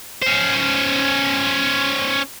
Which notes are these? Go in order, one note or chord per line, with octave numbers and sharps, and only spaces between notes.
C#4 C5